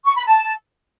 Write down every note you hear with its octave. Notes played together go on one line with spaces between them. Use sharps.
C#6
B5
A5